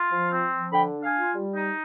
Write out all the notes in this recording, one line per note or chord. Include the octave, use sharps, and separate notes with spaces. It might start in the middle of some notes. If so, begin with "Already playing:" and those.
Already playing: F4
F3
C4
F3
D3 G5 B5
D4
F5 G#5
F4
G3
D#4